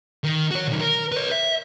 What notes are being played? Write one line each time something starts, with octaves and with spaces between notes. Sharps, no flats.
D#3
F#4 C#5
B1 D#3
A#4
B4 C#5
E5